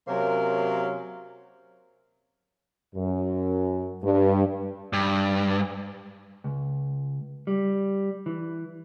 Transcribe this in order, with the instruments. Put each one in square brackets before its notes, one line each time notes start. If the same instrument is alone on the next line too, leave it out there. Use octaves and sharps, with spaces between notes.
[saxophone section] C3 F#3 A#3 C#4 A#4 C5
[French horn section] F#2
G2
[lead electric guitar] G2
[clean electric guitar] C#2
G3
E3